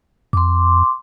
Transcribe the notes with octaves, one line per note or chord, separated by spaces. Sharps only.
F2 C6 D6